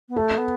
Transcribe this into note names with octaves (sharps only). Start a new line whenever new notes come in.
B3
A3 A4
B3